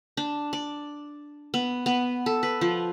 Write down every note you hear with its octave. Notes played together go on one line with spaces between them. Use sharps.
D4
D5
B3
B3
A4
B4
F3